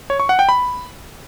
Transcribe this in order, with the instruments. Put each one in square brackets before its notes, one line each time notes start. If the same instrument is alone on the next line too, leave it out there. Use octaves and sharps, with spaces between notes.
[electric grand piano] C#5
C#6
F#5
G5
B5